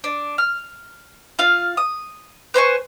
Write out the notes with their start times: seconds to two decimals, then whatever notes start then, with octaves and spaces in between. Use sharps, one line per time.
0.04 D4
0.38 F6
1.39 F4 F5
1.77 D#6
2.54 B4 C5 G#5 C#6